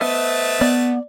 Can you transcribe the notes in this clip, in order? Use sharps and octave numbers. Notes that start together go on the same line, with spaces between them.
A3 B3 B4 C5 D#5 E5 A5
B3 D5